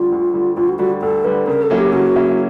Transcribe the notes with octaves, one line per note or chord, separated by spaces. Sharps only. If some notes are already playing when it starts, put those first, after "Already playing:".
Already playing: D2 D3 G3 F4
D2
D3 G3
D2 F4
F#4
D3 G3 F#4
D2 A4
D3 G3 B4
C#3 A#4
A4
F#3 A#3 C#4 E4
G4
C#3 F#4
F#3 A#3 C#4 E4